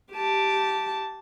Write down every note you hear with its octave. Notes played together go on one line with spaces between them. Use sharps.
G4 A5